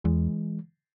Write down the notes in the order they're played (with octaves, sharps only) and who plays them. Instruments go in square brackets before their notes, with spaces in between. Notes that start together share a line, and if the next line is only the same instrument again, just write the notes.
[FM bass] E2 [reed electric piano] E3 G#3